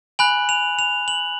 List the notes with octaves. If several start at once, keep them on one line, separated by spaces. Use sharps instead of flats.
G#5 B5 F#6 F#7
F7
F7
F#7